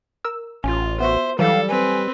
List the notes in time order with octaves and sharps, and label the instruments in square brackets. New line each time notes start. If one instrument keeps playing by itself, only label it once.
[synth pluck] A#4 E6
[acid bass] A1 [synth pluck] C#4 [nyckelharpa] F4
[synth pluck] B3 F#4 [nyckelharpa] C5 [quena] E5
[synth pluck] E3 F#3 [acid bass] G3 [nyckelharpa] A4 [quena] F5
[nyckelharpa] C4 B4 [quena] G#5